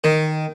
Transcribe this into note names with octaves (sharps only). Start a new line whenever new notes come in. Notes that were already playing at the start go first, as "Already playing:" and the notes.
D#3